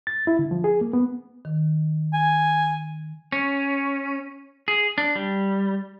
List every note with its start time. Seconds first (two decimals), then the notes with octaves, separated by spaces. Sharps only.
0.07 A6
0.27 E4
0.39 D3
0.51 F3
0.64 G#4
0.81 A#3
0.93 B3
1.45 D#3
2.13 G#5
3.32 C#4
4.68 G#4
4.98 D4
5.16 G3